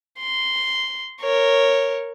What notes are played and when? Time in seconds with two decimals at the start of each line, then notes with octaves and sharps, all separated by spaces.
0.19 C6
1.21 A#4 C#5